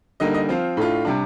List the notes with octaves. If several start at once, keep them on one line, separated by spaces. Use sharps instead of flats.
D3 G3 A#3 D#4 D#5
D#5
F3 C4 F4
A2 A3 D4 F4
C3 G3 D4